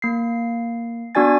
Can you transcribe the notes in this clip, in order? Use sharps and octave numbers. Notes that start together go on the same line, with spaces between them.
A#3 C7
B3 D4 F#4 D5 G#5 A6